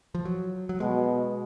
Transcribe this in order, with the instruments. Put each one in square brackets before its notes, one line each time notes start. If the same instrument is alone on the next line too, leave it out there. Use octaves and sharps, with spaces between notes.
[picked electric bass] F3
F#3
F#3
[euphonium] B2 [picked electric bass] G#3